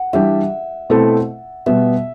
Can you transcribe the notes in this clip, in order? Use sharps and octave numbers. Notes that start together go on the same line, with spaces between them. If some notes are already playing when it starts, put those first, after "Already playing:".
Already playing: F#5
E3 G3 D4 G4 E5
B2 A3 C4 E4 A4
B2 G3 B3 E5